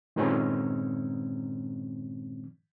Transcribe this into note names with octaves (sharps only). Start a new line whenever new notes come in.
G2 A#2 D#3 G#3 C4 C#4